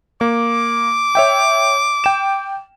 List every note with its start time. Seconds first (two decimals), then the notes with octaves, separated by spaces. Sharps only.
0.21 A#3 D6
1.15 C#5 E5 G5
2.04 G5 E7